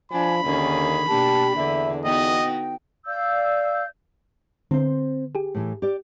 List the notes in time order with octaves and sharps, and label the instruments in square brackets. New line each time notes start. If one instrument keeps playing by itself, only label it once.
[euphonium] F3 [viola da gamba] D4 [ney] G#5 [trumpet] B5
[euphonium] D#2 [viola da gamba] D3 D#3 G#4 [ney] C#4
[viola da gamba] B2 A#3 D4 [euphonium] G4 [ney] A5
[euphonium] E2 [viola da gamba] D3 [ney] E5
[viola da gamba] B3 D#4 F#4 [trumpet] D#5 [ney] G5
[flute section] D5 F5 E6 G6
[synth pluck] D3 [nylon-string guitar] C4 C5
[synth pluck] G4 G#4
[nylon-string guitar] A2 E3
G4 D5